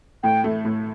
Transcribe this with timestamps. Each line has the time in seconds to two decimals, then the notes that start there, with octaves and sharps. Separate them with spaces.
0.23 A2 G5
0.44 A3
0.65 A2